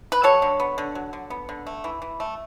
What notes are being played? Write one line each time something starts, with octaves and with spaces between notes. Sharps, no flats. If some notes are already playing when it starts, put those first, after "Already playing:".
B4
F#3 A4 C#5
D3
B3
D3
F#3
D3
B3
D3
A3
E3
E3
A3